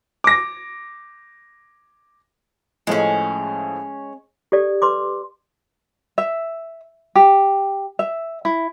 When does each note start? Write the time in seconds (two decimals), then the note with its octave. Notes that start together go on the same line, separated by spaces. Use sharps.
0.24 D6 A#6
2.87 A2 F3 G#3 A3 C#4
4.52 G4 A4 D5
4.82 B4 C6 D6
6.18 E5
7.15 G4
7.99 E5
8.45 E4